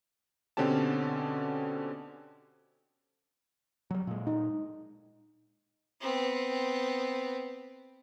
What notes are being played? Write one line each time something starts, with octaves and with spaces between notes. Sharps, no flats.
B2 D3 C4 C#4 G4 A5
F#3 G3
A#2 G#3
D#4
B3 C4